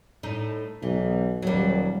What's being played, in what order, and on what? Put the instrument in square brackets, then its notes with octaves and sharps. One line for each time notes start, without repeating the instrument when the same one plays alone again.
[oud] A2 D#4
[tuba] B1 [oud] E3
[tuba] D#1 [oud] F#3 G3